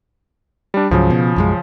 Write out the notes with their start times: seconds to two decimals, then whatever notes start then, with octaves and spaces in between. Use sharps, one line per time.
0.74 G3 D4
0.91 C#2 G#2 C#3 F3 F#3
1.10 B2
1.36 B1 F#2 G#3